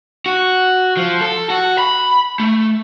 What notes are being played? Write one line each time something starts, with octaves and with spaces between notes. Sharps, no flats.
F#4
F3
A4
F#4
B5
A3